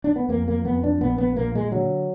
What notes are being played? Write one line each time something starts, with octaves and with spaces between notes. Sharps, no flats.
D4
B3
F2 A#3
A#3
F2 B3
D4
A#1 B3
B3
A#2 A#3
G#3
D3 F#3